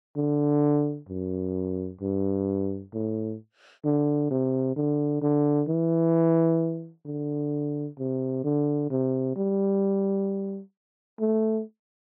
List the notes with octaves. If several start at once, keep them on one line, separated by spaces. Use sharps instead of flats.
D3
F#2
G2
A2
D3
C3
D3
D3
E3
D3
C3
D3
C3
G3
A3